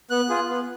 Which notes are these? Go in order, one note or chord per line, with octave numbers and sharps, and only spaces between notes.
B3 F#6
F4 G#4
B3